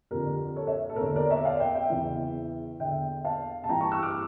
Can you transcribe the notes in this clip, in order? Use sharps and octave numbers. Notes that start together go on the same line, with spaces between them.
F2 D3 G4 A#4
A4 C#5
C#5 E5
A4
A#4
E2 D3 A4 C#5
A#4 D5
C#5 E5
D5 F5
E5 G5
E5 G5
E2 C#3 E3
E2 D3 E5 G5
F5 A5
A5
G2 E3 G5 A#5
A5 C#6
C#6 E6
D6 F6